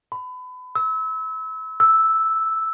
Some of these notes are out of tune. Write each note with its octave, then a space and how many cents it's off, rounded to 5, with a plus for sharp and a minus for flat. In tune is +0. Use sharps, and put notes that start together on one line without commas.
B5 +30
E6 -30
E6 -5